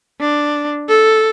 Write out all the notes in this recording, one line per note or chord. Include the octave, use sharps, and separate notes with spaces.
D4
A4